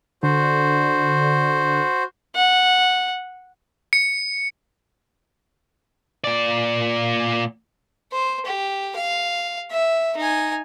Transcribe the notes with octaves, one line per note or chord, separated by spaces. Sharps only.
D3 F#4 C5
F#5
C#7
A#2 D5
C5
G4
F5
E5
D#4 G#5